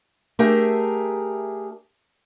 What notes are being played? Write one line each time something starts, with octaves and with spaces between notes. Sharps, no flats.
A3 D4 G4 G#4 A#4 E5